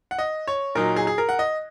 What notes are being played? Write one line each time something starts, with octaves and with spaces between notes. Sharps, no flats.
F#5
D#5
C#5
A#2 F#3 D#4 A#4
G#4
G#4
A#4
F#5
D#5